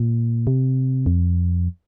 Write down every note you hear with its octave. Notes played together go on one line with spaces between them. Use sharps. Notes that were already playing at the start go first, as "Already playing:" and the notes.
Already playing: A#2
C3
F2